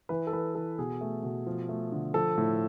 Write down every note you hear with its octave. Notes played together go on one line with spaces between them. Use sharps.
E3 B4
A4
E3 B4
E3 A4
B2 G#4
A3
B2
F3
A3
D3
F3 A4
A2